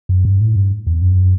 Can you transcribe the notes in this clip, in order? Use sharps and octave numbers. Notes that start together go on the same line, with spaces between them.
F#2
G2
A2
G2
E2
F#2